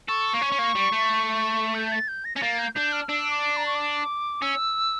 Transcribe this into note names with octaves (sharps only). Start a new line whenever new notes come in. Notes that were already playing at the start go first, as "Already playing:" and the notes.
A4 C#6
A#3
C#4
C#4
A#3
G3
A3
G6
A6
G6
A#6
C#4 A#6
A#3 A6
G6
D4 G6
F6
D4 E6
D6
A#5
C#6
D6
C#4 E6